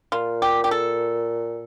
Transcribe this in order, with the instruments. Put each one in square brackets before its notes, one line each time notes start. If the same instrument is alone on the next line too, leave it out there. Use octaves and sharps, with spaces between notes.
[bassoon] A#2 [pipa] F4
[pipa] G4
G4
A4